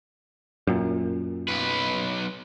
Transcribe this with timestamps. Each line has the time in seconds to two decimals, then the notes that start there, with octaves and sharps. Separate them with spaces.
0.67 F#2 A#2
1.48 B1 B4